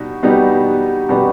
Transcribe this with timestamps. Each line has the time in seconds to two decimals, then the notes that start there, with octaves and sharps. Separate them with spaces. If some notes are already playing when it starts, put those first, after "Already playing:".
Already playing: B2 G3 D#4
0.23 B2 G3 B3 D#4 G4
1.09 B2 G3 B3 D#4 G4